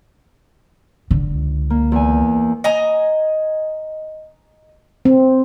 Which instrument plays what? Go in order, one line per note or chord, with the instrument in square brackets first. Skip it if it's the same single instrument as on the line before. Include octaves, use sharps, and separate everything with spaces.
[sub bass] F1 [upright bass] D3
[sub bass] C#2
[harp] A#3
E2 G#5
[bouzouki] D#5 G#5 A#5
[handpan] C4